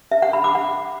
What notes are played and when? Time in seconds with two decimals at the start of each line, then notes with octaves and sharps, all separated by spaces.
0.12 E5
0.22 F#5
0.33 B5
0.44 D6
0.55 F#5